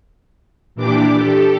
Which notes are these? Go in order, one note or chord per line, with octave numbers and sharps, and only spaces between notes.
A#2 E3 D4 G4 D6
G4 A4